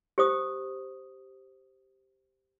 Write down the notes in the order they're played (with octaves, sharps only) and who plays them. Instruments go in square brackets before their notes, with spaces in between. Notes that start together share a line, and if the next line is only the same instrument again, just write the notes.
[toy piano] G4 C5 D#6